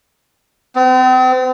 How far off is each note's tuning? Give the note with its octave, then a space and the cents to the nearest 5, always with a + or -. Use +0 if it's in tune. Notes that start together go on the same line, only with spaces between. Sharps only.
C4 -40